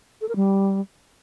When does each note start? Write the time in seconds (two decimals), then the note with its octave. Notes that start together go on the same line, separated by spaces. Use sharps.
0.21 A4
0.29 A#4
0.36 G3